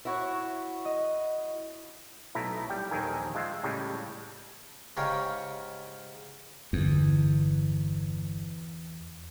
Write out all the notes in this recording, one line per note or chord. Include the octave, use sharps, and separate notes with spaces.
E4 F#4 C#5
D#5
B1 B2 A3 E4 A#5
G3 G5
A#1 D#2 D#3 A4 A#4 G#5
G#3 F4 E5 G5
A2 C#3 G3 G#3
G#2 C#3 G4 A#4 C#5 F5
G1 E2 D3